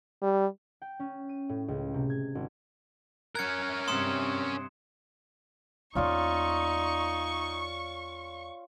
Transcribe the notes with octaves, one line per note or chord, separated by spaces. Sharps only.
G3
G5
C#4
D#7
A2
C#2
C3
G#6
G#1
C#4 A#4 F#6 G#6 C#7
G2 C3 C6 D#6 E7
E2 A#3 C#4 D#4 F4 D5 C#6